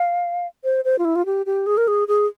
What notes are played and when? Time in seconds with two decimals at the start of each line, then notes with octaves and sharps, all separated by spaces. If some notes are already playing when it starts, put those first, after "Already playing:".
Already playing: F5
0.64 C5
0.85 C5
0.99 F4
1.05 E4
1.16 F4
1.26 G4
1.46 G4
1.66 G#4
1.77 A#4
1.88 G#4
2.08 G#4